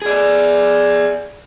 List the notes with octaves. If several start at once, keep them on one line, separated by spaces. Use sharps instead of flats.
G#4 D5